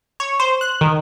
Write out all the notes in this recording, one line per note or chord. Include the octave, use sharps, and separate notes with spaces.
C#5
C5
F#6
D#3